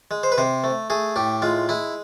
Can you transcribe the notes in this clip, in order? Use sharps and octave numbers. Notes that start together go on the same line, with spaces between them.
G#3
C5
B4
C3 C5
A3
A3 G#4
A2 G4
G#3 F4
G#3 E4